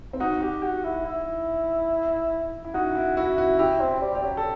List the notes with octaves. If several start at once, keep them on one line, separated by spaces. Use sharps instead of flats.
C4
D#4 F#4
G4
F#4
E4
E4
E4
D#4 F#4
E4
E4 F#4
F#4
E4 G4
C4
G3
G3 G4
F#3
A4